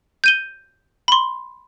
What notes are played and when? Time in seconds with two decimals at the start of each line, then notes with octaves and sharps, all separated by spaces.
0.24 G6 D#7 G7
1.08 B5 C6